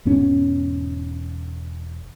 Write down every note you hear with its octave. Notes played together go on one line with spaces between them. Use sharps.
E1 G#2 B3 C#4